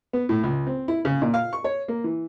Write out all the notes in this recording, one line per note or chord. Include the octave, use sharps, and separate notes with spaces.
B3
A2
C#2
C4
E4
C#3
A#2
F5
C#6
C#5
A#3
E3